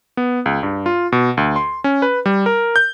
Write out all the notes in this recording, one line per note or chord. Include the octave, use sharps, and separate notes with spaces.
B3
C#2
G2
F4
B2
D2
C6
C#4
B4
G3
A#4
G6